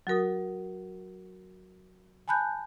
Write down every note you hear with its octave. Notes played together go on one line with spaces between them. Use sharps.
F#3 F#4 A#4 D#6
G#5 A5 B5 F#6 G6